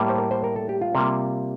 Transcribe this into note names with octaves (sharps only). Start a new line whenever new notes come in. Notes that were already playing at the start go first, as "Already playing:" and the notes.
Already playing: A2 G3 A#3
C5
A#4
C5
A#4
A4
G4
F4
C3 G3 A#3